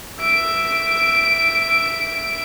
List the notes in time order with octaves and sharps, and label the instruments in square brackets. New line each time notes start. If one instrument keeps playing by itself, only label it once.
[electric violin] E5 D7